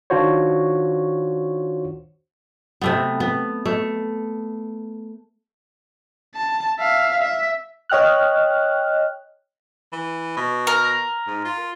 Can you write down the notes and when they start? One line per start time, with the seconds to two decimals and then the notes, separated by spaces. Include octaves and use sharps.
0.10 D#3 D4 F4 F#4 C5 C#5
2.81 C3 A3 B3
3.20 B3
3.66 A3
6.35 A5
6.80 E5 F5
7.21 E5
7.89 C#5 D#5 G5 F6 F#6
9.93 E3
10.36 B2
10.67 A#4
11.27 G#2
11.45 F4